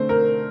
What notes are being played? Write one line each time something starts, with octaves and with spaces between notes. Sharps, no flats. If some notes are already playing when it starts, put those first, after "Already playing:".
Already playing: D3 A3 C4 C5
A#4